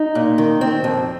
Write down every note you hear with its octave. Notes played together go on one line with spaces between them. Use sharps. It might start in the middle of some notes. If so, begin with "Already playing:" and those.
Already playing: D#4
A#2
D#3
C4
F2